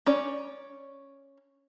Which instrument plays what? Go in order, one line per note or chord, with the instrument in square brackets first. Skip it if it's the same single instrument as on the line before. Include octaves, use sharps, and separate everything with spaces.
[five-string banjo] C#4 C#5 D5